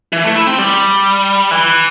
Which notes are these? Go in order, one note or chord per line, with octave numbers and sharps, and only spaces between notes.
E3
A3
E4
C4
G3
E3